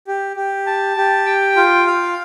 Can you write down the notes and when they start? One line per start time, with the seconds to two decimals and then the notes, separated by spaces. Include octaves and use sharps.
0.07 G4
0.36 G4
0.67 A5
0.97 G4
1.26 G5
1.56 F4
1.87 F5